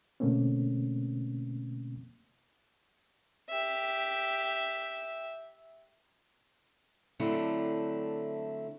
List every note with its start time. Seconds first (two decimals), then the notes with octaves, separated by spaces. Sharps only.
0.20 B2 D3 A3 A#3 C4 C#4
3.49 G4 E5
7.20 D3 F#3 A3 C4 D4 E4